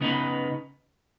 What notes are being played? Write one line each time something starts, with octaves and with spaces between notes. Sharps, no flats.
C#3 B3 D#4 B4